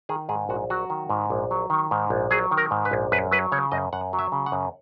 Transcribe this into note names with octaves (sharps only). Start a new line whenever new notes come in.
D#3 G#4
G#2 G#4
A#1 F#4
F#3 F#4
D#3
G#2
A#1
F#3
D#3
G#2
A#1
F#3 G#4
D#3
A#4
G#2
B4
A#1
F#2 B4
F#3 B4
C#3 C#5
F#2 D#5
F#2 F#5
F#3
E5
C#3
F#5
F#2